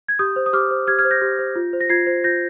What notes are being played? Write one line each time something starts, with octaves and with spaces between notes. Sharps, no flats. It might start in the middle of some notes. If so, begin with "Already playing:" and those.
G#6
G4 D#6 G6
C5
D#6
G4 D6 F6
C5
G4 F6 G#6
F6 G#6
C5
G6 A#6
G4
C5
F4
C5
A#6
F4 G#6 C7
C5
F4 G6 A#6